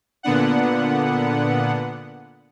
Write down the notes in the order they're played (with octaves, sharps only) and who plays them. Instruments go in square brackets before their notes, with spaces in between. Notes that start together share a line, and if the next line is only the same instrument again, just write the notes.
[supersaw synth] A#2 D3 B3 D4 F#5